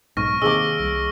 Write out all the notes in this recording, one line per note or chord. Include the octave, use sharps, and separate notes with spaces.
B1 G#2 C#6 F6 A#6
D#2 C3 G#3 D6 E6 G7
C2